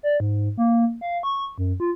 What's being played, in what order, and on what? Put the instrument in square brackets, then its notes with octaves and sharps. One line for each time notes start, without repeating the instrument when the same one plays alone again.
[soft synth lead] D5
G#2
A#3
F5
C#6
F#2
F4